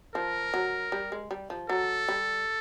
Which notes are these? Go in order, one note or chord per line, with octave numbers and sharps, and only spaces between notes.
F3 A#4
F#3
G3
G#3
G3
F3
F#3 A4
G3